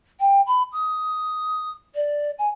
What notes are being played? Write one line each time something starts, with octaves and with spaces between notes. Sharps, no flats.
G5
B5
D#6
D5
G#5